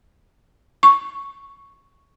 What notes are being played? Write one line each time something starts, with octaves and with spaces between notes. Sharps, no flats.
C#6